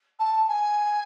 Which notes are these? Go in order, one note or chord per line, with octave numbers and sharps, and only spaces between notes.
A5
G#5